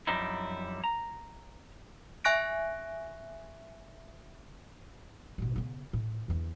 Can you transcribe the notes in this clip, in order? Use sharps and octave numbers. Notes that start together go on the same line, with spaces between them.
F#2 F3 G3 C4 D#4 E4
A#5
E5 G#5 C#6 F#6 A#6 D7
A1 B2
C#3 B3
A2
E2 D3